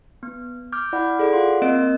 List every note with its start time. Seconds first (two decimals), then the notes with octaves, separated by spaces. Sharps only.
0.23 B3
0.72 D6 F6 G6
0.93 E4 D5 F#5 B5
1.19 G#4 A4 D5
1.33 F4 F5 F#5 C6
1.62 A#3 C4 A#4 D#5 D7